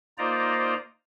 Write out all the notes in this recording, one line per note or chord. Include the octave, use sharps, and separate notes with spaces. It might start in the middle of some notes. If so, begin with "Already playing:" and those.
A#3 D#4 F4 C5 D5 A#5